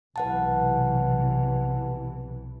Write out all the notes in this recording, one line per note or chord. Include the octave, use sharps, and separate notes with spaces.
B1 C3 E3 B4 F#5 A5